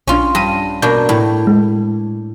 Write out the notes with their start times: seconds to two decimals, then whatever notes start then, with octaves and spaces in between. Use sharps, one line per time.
0.07 A#1 C#4 D4 F4
0.35 G2 A#6 D#7
0.82 B2 A#3 D4 G6
1.09 A2
1.47 G#3